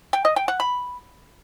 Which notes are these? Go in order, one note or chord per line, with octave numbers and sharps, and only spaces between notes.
G5
D#5
G5
F#5
B5